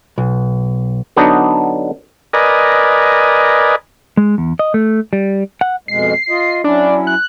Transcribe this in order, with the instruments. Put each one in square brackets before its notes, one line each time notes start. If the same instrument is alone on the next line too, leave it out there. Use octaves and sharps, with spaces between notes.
[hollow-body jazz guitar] B1
[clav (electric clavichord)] D3 F#3 B3 D4 D#4
[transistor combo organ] A#4 B4 D5 D#5 G#5
[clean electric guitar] G#3
E2
D#5
A3
G3
F#5
[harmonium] F2 B2 G#3 [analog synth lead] C7
[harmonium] F4 D#5
[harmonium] F#3 C#4 E4 [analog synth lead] D4
[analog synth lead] F#6